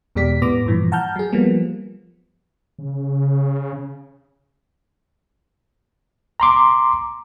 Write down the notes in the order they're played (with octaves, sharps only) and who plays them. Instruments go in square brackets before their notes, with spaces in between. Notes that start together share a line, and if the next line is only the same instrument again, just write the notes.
[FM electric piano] E2 B2 G#3 G4 D5 B6
A2 B3 D6 A#6
G2 A#2 E3 F3
F#5 A5 A#5 F6 G6
F#3 G#4
F3 G3 A#3 B3
[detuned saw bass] C#3
[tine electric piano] A#5 C6 D6